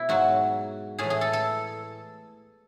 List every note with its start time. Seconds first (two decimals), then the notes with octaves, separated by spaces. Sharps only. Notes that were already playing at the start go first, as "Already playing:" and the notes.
Already playing: B2 E4
0.09 G#2 F#3 F#4
0.99 A2 E3 G#4
1.10 G#4
1.21 A4
1.33 A4